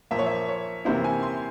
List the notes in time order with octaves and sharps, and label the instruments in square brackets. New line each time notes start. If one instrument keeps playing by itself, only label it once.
[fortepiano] A#2 F3 A#3 [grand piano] E5
[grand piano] C#5
E5
C#5
[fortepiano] C3 E3 A#3 E4 [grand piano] C5
[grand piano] G#5
C6